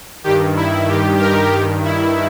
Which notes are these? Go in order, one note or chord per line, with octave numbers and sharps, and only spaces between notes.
G2 D#3 G4
E4
G2 D#3 G4
G4 A#4
G2 D#3 G4
E4